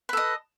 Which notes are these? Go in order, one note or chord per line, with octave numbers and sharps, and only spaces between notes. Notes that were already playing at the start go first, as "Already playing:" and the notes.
A4 B4 D#5